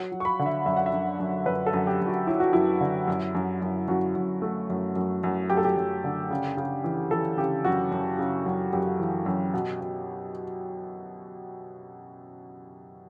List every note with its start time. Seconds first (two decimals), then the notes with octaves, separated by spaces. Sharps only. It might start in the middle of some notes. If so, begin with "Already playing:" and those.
Already playing: F#3 F#5
0.12 F#3
0.20 C#6
0.25 B5
0.39 D3
0.46 E5
0.66 F#2 E5
0.77 F#5
0.86 E5
0.93 F#2
1.19 F#2
1.46 F#2 B4
1.66 A4
1.73 F#2
1.87 G4
2.01 F#2
2.07 F#4
2.27 F#3 E4
2.40 F#4
2.53 F#2 E4
2.81 D3
3.07 F#2
3.35 F#2
3.62 F#2
3.88 F#2 F#4
4.16 F#2
4.42 A3
4.70 F#2
4.96 F#2
5.24 F#2
5.50 F#2 G4
5.57 A4
5.64 G4
5.77 F#2
6.04 D3
6.30 C#3
6.57 C#3
6.84 E3
7.11 E3 A4
7.38 C#3 G4
7.65 F#2 F#4
7.91 F#2
8.19 C#3
8.46 F#2
8.73 F#2 G4
9.00 E3
9.26 F#2
9.54 B2
9.81 B2